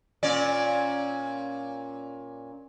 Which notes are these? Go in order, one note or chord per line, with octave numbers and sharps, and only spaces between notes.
A#2 C#4 D5